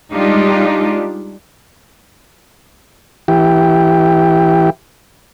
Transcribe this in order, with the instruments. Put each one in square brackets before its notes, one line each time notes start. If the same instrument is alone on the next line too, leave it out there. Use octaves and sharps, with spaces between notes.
[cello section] G3 G#3 D4 D#4 F4 G4
[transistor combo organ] E3 G4